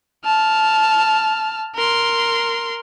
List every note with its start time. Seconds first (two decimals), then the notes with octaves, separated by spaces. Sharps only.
0.25 A5 F6
1.75 A#4 C6